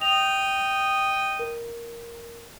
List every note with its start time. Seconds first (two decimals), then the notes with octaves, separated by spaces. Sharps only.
0.01 D#5 G5 F7
1.39 A#4